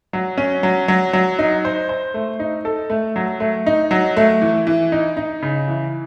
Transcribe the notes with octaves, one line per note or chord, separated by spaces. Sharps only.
F#3
C#4
F#3
F#3
F#3
D#4
C5
C5
A3
D#4
A4
A3
F#3
A3
D#4
F#3
A3
E3
E3
D#4
D#4
C#3
E3